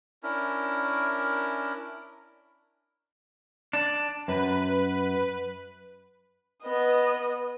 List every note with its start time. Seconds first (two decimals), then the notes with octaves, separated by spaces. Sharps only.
0.23 C#4 D4 E4 A#4
3.73 D4
4.28 F#2 B4
6.63 B3 D#5